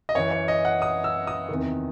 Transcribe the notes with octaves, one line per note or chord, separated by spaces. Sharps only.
D#5
F#2 E3 C#5
C#5
D#5
F#5
D#6
E6
D#6
E2 C3 D#3